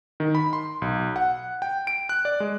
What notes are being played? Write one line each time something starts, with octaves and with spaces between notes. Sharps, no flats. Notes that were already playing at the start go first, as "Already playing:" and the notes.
D#3
B5
C6
B1
F#5
G5
D7
F#6
D5
G#3